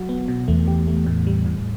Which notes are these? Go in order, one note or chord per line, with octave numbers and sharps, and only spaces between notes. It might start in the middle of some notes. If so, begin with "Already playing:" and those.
Already playing: F#3 F#4
B3
B2
E2 A3
G4
A3
A2
G3
A2